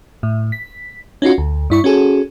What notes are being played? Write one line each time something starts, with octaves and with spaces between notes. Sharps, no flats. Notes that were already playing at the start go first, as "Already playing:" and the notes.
A2
B6
C#4 D#4 F4 F#4
D2
G2 E4 C#6
C#4 F#4 G#4 A4